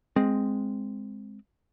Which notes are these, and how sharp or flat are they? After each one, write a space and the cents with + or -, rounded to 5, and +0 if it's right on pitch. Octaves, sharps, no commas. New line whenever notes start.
G#3 +0 C4 +0